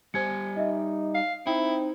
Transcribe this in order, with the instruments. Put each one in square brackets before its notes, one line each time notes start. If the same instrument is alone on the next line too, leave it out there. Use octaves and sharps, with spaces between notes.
[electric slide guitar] G3 G4 G#5 [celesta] C5 G#6 C#7
[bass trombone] D#4 [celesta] D#5 E5
[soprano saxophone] F5
[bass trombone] C4 [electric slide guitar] D#4 [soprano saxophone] E4 [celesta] G5